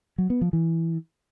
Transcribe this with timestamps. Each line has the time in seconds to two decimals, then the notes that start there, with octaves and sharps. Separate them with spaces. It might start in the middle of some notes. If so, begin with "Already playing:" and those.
0.18 F#3
0.30 B3
0.41 F3
0.53 E3